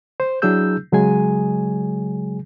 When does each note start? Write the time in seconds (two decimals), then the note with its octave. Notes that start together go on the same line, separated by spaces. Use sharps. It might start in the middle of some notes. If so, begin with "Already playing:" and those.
0.20 C5
0.42 F#3 D4 E4 G#4 E6 G6
0.92 C#3 F#3 G#3 G#4 G#5